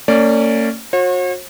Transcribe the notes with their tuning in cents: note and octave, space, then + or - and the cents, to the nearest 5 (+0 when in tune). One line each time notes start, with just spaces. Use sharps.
A#3 -45 C#4 +0 D5 +0
F#4 -35 C#5 -45